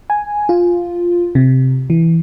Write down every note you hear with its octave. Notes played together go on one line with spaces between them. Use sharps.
G#5
F4
C3
E3